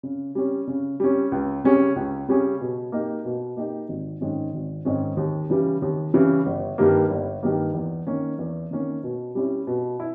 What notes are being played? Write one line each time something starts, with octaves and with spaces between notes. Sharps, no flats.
C#3
G3 C#4
C#3
G3 C#4
C#2
C#3 G3 C#4 G#4
C#2
C#3 G3 C#4 G#4
B2
A#3 D#4 G4
B2
A#3 D#4 G4
G#1
G#2 D#3 G#3 C#4
G#1
G#2 D#3 G#3 C#4
D#2
C#3 E3 G3
D#2
C#3 E3 G3
G1
G2 D#3 G3 A#3
G1
G2 D#3 G3 A#3
E2
D#3 A#3 C#4
E2
D#3 A#3 C#4
B2
G3 C#4 E4
B2
E4